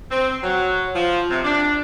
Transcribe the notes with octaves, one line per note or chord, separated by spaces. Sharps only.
C4
F#3
F3
C3
D4